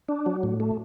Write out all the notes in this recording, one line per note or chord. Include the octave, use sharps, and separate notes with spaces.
D4
F#3
A2
A3